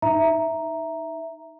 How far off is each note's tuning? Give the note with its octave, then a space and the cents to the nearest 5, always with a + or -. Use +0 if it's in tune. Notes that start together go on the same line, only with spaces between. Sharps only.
D#4 +0 E5 +0 A#5 +0